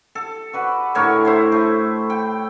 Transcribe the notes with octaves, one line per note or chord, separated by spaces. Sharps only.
A4
F#4 B4 D5
A2 D3 A#4 C#5
E4 C5 C#5
A3
G5